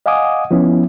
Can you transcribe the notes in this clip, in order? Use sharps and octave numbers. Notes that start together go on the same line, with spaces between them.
D#5 F5 F#5 G#5 D6 D#6
F3 B3 C#4 E4